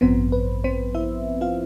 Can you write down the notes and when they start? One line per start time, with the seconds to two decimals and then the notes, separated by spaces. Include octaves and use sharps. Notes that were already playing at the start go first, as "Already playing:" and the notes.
0.01 A1 G2 F3 B3 C4 C5
0.32 B4
0.64 C4 C5
0.94 E4 E5
1.41 F4 F5